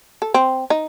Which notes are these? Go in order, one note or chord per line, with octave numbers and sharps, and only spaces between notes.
A4
C4
D#4